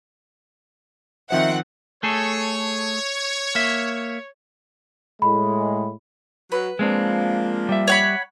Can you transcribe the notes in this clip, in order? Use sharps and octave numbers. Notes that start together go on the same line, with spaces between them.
D#3 F3 C4 C5 E5 F#5
A3 G#4 A4 C#5
A#3 E5
A2 G#3 B5
F#3 F#4 B4
F3 G#3 A#3 C4 D4
G3 E5
C#5 F#5 B5